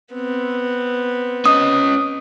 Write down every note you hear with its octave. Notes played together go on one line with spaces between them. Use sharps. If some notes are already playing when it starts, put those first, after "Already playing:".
B3 C4
C#4 D#5 D#6